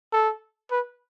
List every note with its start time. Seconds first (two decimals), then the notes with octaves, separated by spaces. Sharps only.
0.13 A4
0.71 B4